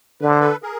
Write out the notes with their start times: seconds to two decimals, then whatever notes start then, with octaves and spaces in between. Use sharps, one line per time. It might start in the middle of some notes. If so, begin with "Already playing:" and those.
0.21 D3 B4
0.30 C5
0.40 A4 B4
0.63 G#4 A#4